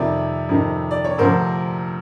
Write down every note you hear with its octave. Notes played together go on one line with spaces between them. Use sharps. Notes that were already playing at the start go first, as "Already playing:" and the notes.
Already playing: F2 C3 D#3 D5 E5
F2 C3 D#3
D5
C#5
D2 C3 F3 A#4 C5